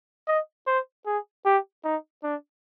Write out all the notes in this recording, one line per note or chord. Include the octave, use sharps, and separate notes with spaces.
D#5
C5
G#4
G4
D#4
D4